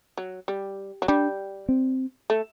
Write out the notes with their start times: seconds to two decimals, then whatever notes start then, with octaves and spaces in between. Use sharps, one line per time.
0.18 F#3
0.48 G3
1.02 F#3
1.08 G3 D4
1.69 C4
2.30 A3